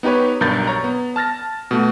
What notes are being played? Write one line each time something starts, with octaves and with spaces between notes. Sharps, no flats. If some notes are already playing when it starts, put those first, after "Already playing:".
B3 D#4 G4 B4 C#5
B1 G2 A#4 G6 A6
C#5 A#5
B3
A5 F6 A6 A#6
B2 A3 F#4